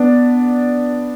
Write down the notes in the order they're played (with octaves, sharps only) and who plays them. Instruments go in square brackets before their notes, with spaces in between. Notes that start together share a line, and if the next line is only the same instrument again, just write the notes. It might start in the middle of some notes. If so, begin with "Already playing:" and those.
Already playing: [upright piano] B3 D4